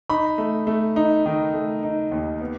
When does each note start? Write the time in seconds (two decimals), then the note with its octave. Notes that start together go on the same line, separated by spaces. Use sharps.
0.10 D#4 B5
0.38 A3
0.67 A3
0.96 D#4
1.26 D#3
1.54 A3
1.83 D#4
2.12 D#2
2.40 B3